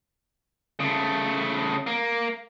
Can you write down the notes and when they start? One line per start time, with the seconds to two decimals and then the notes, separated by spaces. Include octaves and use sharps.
0.80 C#3 A3
1.87 A#3